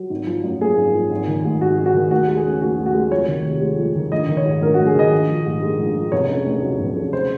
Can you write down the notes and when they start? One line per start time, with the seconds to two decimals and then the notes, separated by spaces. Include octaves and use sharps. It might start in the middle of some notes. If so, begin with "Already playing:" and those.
Already playing: F#3
0.10 G#1
0.27 F3
0.44 F#2
0.61 A#3 G#4
0.77 G#1
0.94 F3
1.11 G#1
1.28 D#3
1.45 G#2
1.61 G#1 F#4
1.79 G#1
1.86 F#4
1.94 D#3
2.11 D#2 F#4
2.28 G#3
2.37 G#4
2.45 C#3
2.61 D#2 F#4
2.78 D#2
2.86 F#4
2.95 G#3
3.12 F2 C#5
3.28 D#3
3.44 C3
3.61 G#3
3.78 F2
3.95 D#3
4.12 A#1 D#5
4.28 D#3
4.37 C#5
4.45 G#2
4.61 A#1 A#4
4.74 A#1 F#4
4.86 G#4
4.95 D#3 D#5
5.12 A#1
5.29 F3
5.46 G#2
5.62 G#3
5.79 A#1
5.95 F3
6.12 F1 C#5
6.29 C#3
6.46 D#2
6.62 F#3
6.79 F1
6.97 C#3
7.13 C5